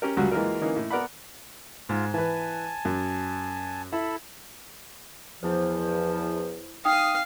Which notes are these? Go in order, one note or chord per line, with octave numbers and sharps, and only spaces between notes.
C#4 G4 A#4
C#2 F#3 G3 F#4 F#5
E3 G#3 A#3 F4 F#4 A#4
E3 A#3 C#4 D#4
A2
B3 A#4 D5 F#5 B5
G#2 F4
E3 B4 G#5 A5
F#2
E4 A4 B5
E2 F3 E4 C5
D#4 F5 G5 D#6